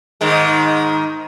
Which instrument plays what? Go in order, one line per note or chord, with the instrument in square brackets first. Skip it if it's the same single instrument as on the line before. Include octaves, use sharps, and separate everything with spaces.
[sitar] G#2 D#3 G#3